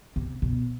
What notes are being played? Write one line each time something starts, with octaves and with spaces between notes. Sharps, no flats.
C3
B2